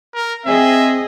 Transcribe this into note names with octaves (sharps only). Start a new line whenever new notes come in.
A#4
C4 G#4 D#5 E5